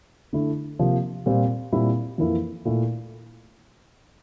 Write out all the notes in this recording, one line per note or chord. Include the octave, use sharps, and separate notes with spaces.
D3 A3 E4
C3 F3 A#3
A#2 G3 C4 F4
A#2 G3 C4 E4
F2 E3 A#3 E4
A#2 A3 E4